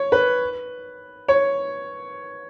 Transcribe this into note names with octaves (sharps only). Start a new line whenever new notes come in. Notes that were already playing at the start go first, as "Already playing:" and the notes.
Already playing: C#5
B4
C#5